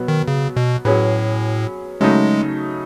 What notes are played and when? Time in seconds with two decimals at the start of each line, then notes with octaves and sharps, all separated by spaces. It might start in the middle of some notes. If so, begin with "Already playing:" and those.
Already playing: B2 F#3 B3
0.08 D#3
0.28 C#3
0.56 B2
0.85 A2 F#3 C#4 G#4 B4
2.01 C#3 F#3 G#3 A3 D#4